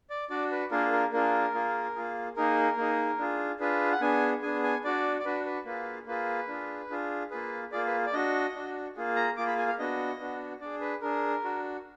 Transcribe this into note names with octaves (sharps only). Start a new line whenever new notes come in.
D5
D4 F#4 D5
B4
A#3 D4 F4 G#4 A#4
A#4
A#3 D4 F4 G#4 A#4
A#3 F4 G#4
A#3 F4 G#4
A#3 D#4 G#4 A#4
A#3 D#4 G#4
D4 F4 G#4
D4 F4 G#4 B4
F#5
B3 D4 G#4 G#5
B3 D4 G#4 G#5
G#5
D4 F#4 D5
D5
D4 F#4 B4
B4
A#3 F4 G#4 B4
A#3 F4 G#4 B4
D4 F4 G#4
D4 F4 G#4
A#3 F4 G#4 B4
A#3 F4 G#4 D5
B4
D5
D4 F#4 D#5
D4 F#4
A#3 F4 G#4
A#5
A#3 F4 G#4 D6
B5
G#5
F5
B3 D4 F#4 D#5
B3 D4 F#4
D4 G#4 D5
B4
D4 G#4 A#4
D4 F#4